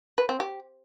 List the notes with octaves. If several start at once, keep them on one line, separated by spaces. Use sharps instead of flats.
B4
C4
G4